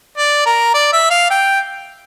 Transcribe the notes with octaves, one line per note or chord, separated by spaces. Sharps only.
D5
A#4
D5
E5
F5
G5